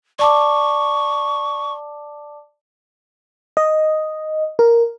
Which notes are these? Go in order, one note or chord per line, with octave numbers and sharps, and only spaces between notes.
D5 A5 C#6 D6
D#5
A#4